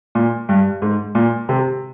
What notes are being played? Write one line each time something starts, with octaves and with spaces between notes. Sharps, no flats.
A#2
G2
G#2
A#2
C3